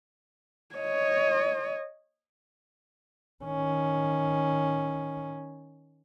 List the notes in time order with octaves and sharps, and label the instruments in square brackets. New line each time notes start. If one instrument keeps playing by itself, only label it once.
[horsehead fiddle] C#5 D#5
[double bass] D#3 C#4